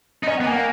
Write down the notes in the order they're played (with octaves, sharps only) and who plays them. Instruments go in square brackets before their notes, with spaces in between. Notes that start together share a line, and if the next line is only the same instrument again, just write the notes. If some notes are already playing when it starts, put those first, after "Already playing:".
[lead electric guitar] D#4
[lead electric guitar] C#4 [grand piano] D#5
[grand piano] F#5
[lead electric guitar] B3
[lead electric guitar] A#3 [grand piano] G#5
[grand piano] F#5